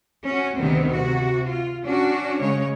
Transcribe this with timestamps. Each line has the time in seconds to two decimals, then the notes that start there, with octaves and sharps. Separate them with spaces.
0.27 C#4 F#4
0.59 D2 C3 D#3 B3 C4
0.90 C3 F#4
1.49 F4
1.84 C#4 D4 F#4
2.39 C#3 G#3 C#5